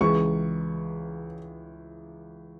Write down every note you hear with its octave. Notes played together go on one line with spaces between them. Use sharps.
C#2 C#3 E3 C#6